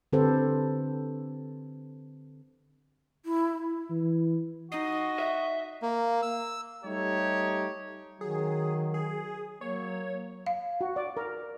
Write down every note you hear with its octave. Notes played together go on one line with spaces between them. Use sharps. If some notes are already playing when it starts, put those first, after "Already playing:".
D3 C4 G4 A4 B4 C5
E4
E3
D#4 F#4 D#5 C7
E5
A#3
E6
G3 A3 D#4 G4 C#5
D#3 F#3 G#4
G#4
F#3 A#3 C#5
F5
F#4
D5
A#4